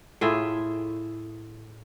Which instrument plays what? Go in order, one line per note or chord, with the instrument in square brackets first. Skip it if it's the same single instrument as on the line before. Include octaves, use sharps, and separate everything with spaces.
[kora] A2 F4 G#4 E5